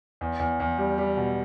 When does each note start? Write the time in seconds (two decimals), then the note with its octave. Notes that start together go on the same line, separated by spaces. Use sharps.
0.21 E2
0.40 E2
0.60 E2
0.78 G3
0.98 G3
1.17 B2